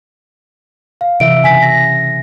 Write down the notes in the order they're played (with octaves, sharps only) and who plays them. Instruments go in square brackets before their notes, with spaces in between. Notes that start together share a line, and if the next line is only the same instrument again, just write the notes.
[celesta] F5
[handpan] C3 E3 E5 [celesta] D7
[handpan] C#3 [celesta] G#5 B6
[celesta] A#6